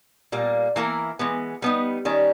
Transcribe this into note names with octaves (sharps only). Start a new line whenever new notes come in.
A#2 G3 A#3
E3 A#3 E4 A#4
E3 G#3 B3
G3 B3 D#4
D#3 G3 C#4